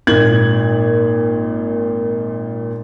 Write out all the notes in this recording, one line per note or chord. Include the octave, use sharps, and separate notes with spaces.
G#1 A#2 G#6 F#7